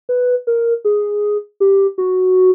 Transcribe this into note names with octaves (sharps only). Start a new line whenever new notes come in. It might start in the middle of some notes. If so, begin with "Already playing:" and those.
B4
A#4
G#4
G4
F#4